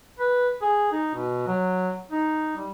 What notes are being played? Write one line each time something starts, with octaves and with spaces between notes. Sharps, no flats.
B4
G#4
D#4
B2
F#3
D#4
G3